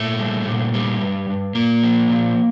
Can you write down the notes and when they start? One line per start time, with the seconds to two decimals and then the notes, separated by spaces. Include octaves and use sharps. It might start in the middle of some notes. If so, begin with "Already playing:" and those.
Already playing: A#2 A3
0.19 G3
0.46 A#2
0.74 G3
1.02 G2
1.29 G2
1.55 A#2 A#3
1.83 F3
2.10 A#2